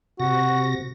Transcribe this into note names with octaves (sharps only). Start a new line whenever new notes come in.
C3 F#4 A#6